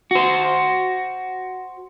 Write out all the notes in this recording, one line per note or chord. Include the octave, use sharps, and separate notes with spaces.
F#4 C5